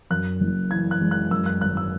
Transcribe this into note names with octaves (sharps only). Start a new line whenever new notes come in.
F#2 F#6
F#1
E3 G#6
F#6
G#3
F#6
F#2 E6
F#6
G#1 F#6
E6